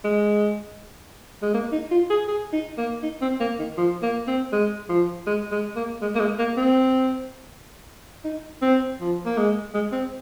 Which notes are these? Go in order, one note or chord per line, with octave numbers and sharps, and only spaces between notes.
G#3
G#3
A#3
D#4
F4
G#4
G#4
D#4
A#3
D#4
C4
A#3
D#3
F3
A#3
C4
G#3
F3
G#3
G#3
A#3
G#3
A#3
G#3
A#3
C4
D#4
C4
F3
A#3
G#3
G#3
C4